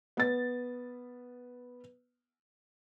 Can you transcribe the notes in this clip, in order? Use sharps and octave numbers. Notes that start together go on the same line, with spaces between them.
B3 A6